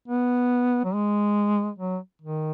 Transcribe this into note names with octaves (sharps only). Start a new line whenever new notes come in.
B3
F#3
G#3
F#3
D#3